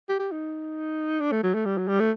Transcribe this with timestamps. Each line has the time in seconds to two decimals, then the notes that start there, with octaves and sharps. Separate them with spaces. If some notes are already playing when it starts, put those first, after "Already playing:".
0.09 G4
0.19 G4
0.31 D#4
1.20 D4
1.31 A3
1.43 F#3
1.54 A3
1.65 G3
1.77 F#3
1.88 G3
2.00 A3